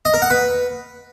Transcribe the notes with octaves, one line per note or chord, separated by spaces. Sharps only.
D#5
A#4
F#5
B4